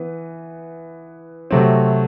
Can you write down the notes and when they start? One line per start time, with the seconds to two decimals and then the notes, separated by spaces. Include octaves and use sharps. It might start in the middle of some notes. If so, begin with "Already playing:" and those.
Already playing: E3 B3
1.51 C3 F#3 A3 C4